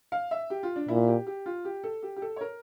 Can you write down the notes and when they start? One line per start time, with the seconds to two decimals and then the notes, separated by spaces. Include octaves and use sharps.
0.12 F5
0.31 E5
0.50 G4
0.63 F4
0.76 D4
0.88 A#2 E4
1.07 G4
1.27 G4
1.46 F4
1.65 G4
1.84 A4
2.03 G4
2.16 G4
2.22 A4
2.36 C#5
2.41 A#4